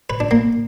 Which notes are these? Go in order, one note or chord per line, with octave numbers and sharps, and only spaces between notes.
B4
D4
A#3